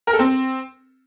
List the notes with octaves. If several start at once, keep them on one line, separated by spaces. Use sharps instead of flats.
A#4
A4
C4